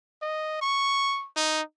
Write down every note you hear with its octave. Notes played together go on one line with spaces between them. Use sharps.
D#5
C#6
D#4